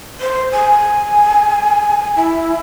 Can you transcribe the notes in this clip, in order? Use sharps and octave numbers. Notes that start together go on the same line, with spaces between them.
C5
G#5
E4